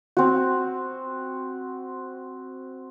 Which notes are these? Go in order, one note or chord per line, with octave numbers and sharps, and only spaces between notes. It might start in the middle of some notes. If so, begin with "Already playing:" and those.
C4 F#4